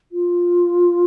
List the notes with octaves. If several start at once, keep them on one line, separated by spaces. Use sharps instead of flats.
F4